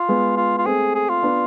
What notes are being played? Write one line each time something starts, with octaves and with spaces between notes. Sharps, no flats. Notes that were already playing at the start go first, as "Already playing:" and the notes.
Already playing: F4
G#3 B3
F4
F4
A3 C4 G#4
G#4
F4
B3 D4